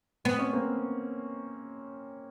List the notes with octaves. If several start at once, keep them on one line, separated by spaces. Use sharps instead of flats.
B3 C4
C#4
A#3 C4